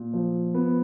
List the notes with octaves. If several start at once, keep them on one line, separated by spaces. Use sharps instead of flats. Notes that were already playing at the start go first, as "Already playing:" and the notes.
Already playing: A#2
F3
B3